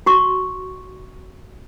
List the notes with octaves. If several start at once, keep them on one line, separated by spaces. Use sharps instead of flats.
F#4 C6 C#6